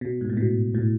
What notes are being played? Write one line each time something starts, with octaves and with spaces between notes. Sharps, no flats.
B2
G#2
A2
B2
A2